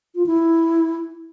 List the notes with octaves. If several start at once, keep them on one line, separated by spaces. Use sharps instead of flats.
F4
E4